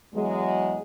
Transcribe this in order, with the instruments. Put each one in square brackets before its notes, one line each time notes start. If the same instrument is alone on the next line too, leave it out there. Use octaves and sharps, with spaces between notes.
[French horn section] E2 F#3 G#3